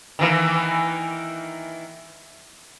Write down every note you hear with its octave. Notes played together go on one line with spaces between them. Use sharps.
D#3 E3 A#3